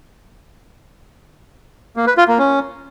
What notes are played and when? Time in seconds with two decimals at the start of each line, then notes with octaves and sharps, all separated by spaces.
1.96 A#3
2.07 B4
2.18 F4
2.28 A#3
2.39 C#4